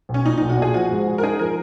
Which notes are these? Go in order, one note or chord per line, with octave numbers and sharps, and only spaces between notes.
B1
C#4
A#2 D#4
B1 D#4
F#4
A#2 G#4
F3 F#4
G#2
G#3
A#4
D#4 G#4
F3 A#4